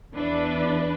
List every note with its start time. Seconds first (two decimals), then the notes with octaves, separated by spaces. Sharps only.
0.12 E2 E3 D4 B4 D5